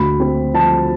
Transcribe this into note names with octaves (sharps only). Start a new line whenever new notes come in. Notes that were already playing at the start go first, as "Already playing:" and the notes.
Already playing: D2 B5
C4
F3 A5